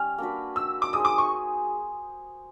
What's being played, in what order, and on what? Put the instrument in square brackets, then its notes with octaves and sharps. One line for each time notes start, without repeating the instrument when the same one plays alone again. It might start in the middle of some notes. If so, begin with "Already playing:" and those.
Already playing: [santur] G3 C#4 [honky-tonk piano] F6
[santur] A#3 D4 F#4 B4
[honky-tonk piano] E6
D6
[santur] D#4 G#4 C5 [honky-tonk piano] D#6
[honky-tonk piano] D6
C#6